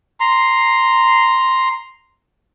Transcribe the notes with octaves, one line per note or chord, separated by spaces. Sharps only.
A#5 C6